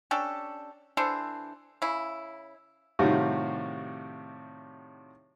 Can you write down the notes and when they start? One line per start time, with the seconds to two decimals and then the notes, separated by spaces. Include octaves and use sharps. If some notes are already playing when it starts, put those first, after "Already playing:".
0.11 C#4 D4 G4 A4
0.97 E3 D4 A4 C5
1.82 C#3 E4
2.99 A2 C3 D#3 G3 F4 F#4